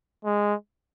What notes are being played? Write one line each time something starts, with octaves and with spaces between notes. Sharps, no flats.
G#3